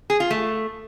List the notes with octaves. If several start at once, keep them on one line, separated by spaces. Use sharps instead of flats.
G#4
F4
A3